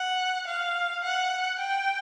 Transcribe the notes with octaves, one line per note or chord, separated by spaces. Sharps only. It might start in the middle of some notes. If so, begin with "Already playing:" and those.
Already playing: F#5
F5
F#5
G5